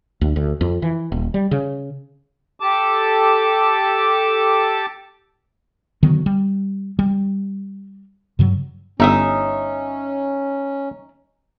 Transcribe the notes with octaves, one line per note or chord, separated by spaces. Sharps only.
D2
D2
F2
E3
D#1
G3
C#3
G4 A4 A5 D6
D3 D#3 F#3 B3
G3
G3
G2 C#3 F#3
G1 C#4 D#4 E5 D#6